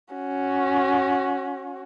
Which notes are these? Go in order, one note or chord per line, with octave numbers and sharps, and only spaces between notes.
C#4 F#4